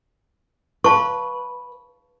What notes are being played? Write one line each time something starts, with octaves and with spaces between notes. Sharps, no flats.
B4 F5 A5 C#6